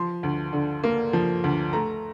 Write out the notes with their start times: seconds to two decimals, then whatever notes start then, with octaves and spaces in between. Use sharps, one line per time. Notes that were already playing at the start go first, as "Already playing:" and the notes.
Already playing: F3 C6
0.23 D2
0.53 D3
0.84 A#3
1.13 F3
1.44 D2
1.73 A3 A#5